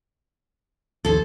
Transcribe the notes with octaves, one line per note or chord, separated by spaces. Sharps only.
A#1 D#2 A4 C5